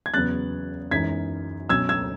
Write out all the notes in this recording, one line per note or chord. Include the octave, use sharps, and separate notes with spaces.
G#6
E2 C#3 F#3 B3 F#6 A6
F#2 E3 G#3 D#4 G#6 B6
B2 F#3 C#4 E6 G#6
E6 G#6